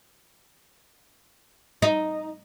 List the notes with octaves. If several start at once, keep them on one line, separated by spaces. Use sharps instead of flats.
D#4